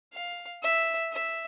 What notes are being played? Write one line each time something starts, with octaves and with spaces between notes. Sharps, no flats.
F5
E5
E5